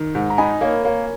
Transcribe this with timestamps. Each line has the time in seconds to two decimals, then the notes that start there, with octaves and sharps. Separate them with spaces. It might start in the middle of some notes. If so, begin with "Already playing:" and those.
Already playing: D#3
0.15 G#2
0.30 A#5
0.38 D#4 G#5 B5
0.61 A#3 A#4 C#5
0.84 A#3 A#4 C#5